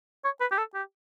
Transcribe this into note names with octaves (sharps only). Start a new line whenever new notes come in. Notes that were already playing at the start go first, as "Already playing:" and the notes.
C#5
B4
G4
A4
G4